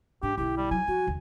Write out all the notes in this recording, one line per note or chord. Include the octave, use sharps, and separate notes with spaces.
G#2 D4 G4
B1 D3 E4 G4
G3
F#3 G#5
F3 F#4
D#2 D3